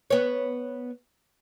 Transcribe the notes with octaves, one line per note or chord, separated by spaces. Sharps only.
B3 C#5